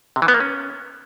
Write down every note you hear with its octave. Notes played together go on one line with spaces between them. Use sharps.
C3
E3
B3
A#3
C#4